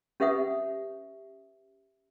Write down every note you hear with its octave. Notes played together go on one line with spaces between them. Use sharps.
C#4 G4 B4 E5 F#5 D#6